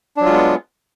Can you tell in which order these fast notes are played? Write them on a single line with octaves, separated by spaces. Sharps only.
D4 F#3 F4 G#3 B3